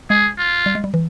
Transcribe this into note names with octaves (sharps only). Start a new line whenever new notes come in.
G#3 G#4
F4
G3
G#3
G3
E3